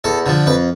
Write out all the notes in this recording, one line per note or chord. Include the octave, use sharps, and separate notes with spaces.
E2 A4
D3 F3
F2 B4